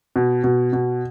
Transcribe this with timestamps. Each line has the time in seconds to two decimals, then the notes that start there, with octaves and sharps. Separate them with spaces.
0.16 B2
0.44 B2
0.73 B2